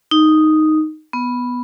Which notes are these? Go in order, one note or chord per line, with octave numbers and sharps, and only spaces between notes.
D#4
B3